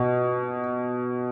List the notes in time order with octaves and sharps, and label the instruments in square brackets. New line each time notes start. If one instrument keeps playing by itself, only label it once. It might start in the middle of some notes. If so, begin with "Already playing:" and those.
Already playing: [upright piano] B2